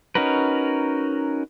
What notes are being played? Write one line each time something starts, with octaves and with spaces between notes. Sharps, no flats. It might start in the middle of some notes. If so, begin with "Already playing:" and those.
C#4 D#4 F#4 A#4 B4